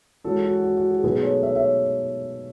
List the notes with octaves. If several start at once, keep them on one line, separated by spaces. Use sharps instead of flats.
E3 G#3 C#4 F#4 A4
F#4
F#4
F#4
G#4
B2 F#3 A3 D#4 G#4 B4
A4 C#5
C#5 E5
C#5 E5